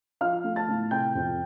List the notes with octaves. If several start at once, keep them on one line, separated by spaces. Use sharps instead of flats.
F3 F5 F6
A3
A5 A6
A2
C3 G5 G6
F2